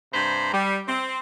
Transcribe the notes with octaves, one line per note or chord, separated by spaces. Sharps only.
G2 C3 C5 A#5 B5
G3
C4